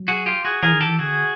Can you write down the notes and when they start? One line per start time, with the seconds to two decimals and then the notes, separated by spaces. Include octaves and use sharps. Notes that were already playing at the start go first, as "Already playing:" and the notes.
Already playing: F#3
0.08 F#4 G#4
0.26 F4 G4
0.45 F#4 G#4
0.63 E3 G#4 A#4
0.73 D#3
0.81 G4 A4
0.86 E3
0.99 D3 F#4 G#4